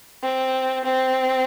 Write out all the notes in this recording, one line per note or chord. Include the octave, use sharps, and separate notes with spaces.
C4
C4